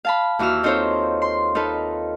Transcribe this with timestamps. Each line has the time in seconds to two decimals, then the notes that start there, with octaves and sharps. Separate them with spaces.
0.05 F5 A5 B5
0.39 D#2 E3 F#4 E6 F6
0.63 C4 D#4 F4 A4 C5 C#5
1.22 C6
1.55 D#4 F4 A4 B4